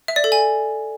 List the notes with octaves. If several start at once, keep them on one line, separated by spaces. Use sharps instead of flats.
E5
D5
A4
G#5